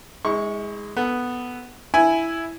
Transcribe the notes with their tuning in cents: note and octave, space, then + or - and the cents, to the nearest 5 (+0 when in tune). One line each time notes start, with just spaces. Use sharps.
G#3 -10 E4 -45 C#6 +0
B3 +0 A4 +0
E4 +0 G#5 +0